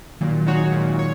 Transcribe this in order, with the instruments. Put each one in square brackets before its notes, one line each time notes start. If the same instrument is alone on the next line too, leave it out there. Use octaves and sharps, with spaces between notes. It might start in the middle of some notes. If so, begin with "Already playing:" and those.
[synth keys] A#2 [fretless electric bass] D#3 F#3
[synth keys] G#3 D#4 F#4 C#5
A#2
C#5